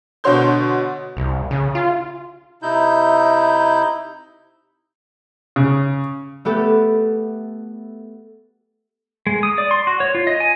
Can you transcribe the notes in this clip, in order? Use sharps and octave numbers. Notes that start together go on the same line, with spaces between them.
B2 D3 F#4 C#5 C6 G6
C2
C#3
F4
C3 D#4 E4 G6
C#3
A3 B3 G4 A4 B4
G#3
D#6
D5
C6
F#4
C#5
F4
D#5
G#5